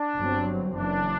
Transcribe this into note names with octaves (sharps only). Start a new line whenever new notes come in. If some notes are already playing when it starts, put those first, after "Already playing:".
Already playing: D4
G1 G2 F#3 C4
F#1 F#2 E3 D4